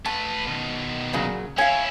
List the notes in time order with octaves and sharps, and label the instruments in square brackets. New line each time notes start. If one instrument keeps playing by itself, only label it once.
[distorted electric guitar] A3 B4 [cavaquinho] A5
[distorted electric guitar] B2 D#3
[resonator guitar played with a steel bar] A#2 C#3 F#3
[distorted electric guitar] C#4 E4 [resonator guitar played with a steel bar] C#5 F5 [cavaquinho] G#5